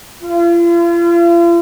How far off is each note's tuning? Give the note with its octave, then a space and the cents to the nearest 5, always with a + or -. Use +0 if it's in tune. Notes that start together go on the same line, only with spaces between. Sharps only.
F4 -40